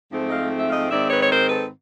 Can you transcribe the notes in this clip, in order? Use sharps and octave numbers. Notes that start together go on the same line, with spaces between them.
G#2 F3 A3 C4
D#5 F5
E5
D#5 F5
G#2 D#3 G#3 C4 D5 E5
B4 C#5
C#5
A#4 C5
A4 B4